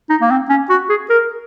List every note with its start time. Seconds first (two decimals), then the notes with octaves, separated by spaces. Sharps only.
0.10 D#4
0.21 A#3
0.31 C4
0.49 C#4
0.70 F#4
0.89 G#4
1.10 A#4